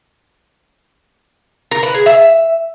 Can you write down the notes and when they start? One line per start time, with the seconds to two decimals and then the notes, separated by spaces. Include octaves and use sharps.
1.71 A#4
1.83 B4
1.94 G#4
2.06 E5